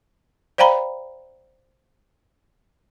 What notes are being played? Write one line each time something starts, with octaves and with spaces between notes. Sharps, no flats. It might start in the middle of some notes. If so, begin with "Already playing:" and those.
C5 D5 F5 G5 A#5 B5